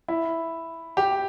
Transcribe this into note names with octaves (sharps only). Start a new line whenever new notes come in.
E4
G4